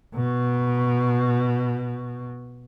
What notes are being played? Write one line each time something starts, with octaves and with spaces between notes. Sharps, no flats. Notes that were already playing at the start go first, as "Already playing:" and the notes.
B2